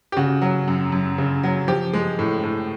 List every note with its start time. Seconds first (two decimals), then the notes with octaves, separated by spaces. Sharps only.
0.12 G4
0.16 C#3 F#4
0.42 F#3
0.68 F#2
0.92 F#2
1.18 C#3
1.43 F#3
1.68 F3 G4
1.93 G#3
2.19 A2
2.43 A2